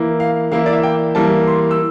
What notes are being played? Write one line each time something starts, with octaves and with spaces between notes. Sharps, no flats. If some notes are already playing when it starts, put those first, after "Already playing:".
Already playing: E3 A#3 E4
F5
E3 A#3 E4 F5
E5
D5
E5
G5
E3 G3 A#3 E4 A5
C6
E6